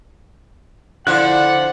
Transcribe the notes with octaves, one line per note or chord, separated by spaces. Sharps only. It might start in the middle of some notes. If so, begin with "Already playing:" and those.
D3 F3 E4 C5 D5 F5 F#5 F#6